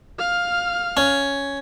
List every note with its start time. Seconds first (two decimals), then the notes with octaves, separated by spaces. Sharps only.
0.19 F5 F6
0.97 C#4